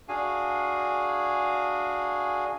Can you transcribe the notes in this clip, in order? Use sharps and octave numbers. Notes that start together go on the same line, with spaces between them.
D4 F#4 G#4 F5 G#5